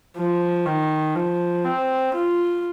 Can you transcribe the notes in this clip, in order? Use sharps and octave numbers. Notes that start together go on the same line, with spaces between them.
F3
D#3
F3
C4
F4